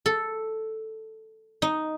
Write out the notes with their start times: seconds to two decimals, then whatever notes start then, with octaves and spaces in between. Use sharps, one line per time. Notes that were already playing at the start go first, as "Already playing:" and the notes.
0.06 A4
1.62 D#4